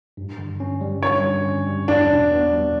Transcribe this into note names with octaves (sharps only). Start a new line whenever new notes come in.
G2
D3
C#4
G3
G2 C#5
D3
C#4
G3
E2 D4
B2
B3
G3